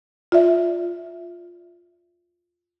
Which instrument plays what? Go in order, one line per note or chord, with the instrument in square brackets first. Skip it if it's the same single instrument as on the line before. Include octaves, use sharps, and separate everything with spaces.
[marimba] F4 D5 E5